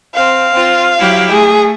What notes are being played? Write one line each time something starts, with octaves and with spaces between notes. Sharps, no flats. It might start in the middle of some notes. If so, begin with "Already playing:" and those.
C4 F5
C4 F4
F#3 E4 G4
A3 G#4